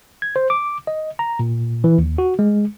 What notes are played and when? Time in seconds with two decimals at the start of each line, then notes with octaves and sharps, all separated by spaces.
0.22 G#6
0.36 C5
0.50 D6
0.87 D#5
1.19 A#5
1.39 A#2
1.84 E3
1.98 D#2
2.18 F#4
2.39 G#3